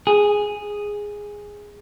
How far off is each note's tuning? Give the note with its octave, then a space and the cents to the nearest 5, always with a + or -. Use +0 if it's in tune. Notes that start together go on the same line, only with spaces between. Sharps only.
G#4 -5